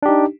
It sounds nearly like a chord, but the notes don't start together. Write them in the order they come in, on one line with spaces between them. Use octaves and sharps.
D4 G4 D#4